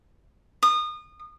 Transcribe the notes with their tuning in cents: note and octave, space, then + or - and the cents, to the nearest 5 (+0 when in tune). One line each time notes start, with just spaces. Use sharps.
D#6 -30